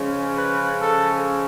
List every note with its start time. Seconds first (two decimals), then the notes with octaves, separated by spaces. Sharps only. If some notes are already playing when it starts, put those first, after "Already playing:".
Already playing: C#3 F3 G#3 C#4
0.37 B4
0.82 A4